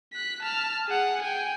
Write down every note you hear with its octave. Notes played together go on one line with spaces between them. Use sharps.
F#6 B6
A5 F6
G#4 F#5
G5 G#5